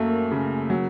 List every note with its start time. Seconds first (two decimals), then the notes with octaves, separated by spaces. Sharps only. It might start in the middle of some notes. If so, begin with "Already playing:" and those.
Already playing: F#2 F#3 A3 A#3
0.31 C#3
0.70 F#3